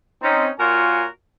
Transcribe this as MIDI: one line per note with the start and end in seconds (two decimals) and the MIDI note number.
0.22 0.48 60
0.22 0.48 61
0.22 0.48 63
0.59 1.06 46
0.59 1.06 65
0.59 1.06 66
0.59 1.06 70
0.59 1.06 73
0.59 1.06 80